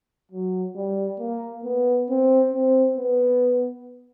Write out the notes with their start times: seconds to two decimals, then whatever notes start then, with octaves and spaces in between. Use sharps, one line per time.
0.32 F#3
0.75 G3
1.19 A#3
1.64 B3
2.09 C4
2.53 C4
2.97 B3